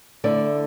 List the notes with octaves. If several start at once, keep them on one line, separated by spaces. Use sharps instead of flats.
D3 A3 E4 D5